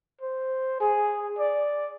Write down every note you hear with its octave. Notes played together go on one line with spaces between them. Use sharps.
C5
G#4
D5